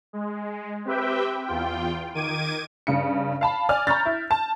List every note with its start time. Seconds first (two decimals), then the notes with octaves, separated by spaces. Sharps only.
0.13 G#3
0.85 C4 G4 B4 E5 G5
1.46 E2 F4 G5
2.15 D#3 D6 G#6 D#7
2.87 G2 C#3 C#7
3.41 F5 A5 B5
3.69 D5 G#5 F6
3.87 A#5 B5 C#6 F6 G6 A6
4.05 E4
4.31 A5